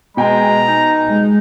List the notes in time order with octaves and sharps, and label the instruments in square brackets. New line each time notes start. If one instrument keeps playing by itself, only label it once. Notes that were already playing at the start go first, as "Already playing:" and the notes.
[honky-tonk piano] B2 G5 G#5 [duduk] G#3 [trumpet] A#5
[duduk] D#4
[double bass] G#3